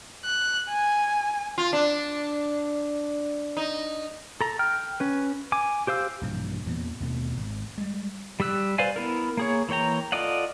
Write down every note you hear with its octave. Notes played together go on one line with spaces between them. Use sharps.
F#6
G#5
F4
D4
D#4
A4 A#5
G5 F6
C#4 B4
G#5 D6
G4 C5 F5 E6
A#1 G2 B2 E3
E2 A#2 E3 B3
D#2 B2 A3
G#1
G3 G#3
G3 G4 E6 F#6
B4 C5 D5 F5 G#5
B3 E4 A#4
A#3 G#4 C#5
E3 A#3 C#5 G5 A#5
F4 A4 D5 D#5 F#5